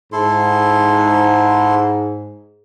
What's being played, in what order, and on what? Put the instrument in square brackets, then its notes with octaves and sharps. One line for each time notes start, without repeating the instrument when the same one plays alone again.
[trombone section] G#2 [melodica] E4 A4 C6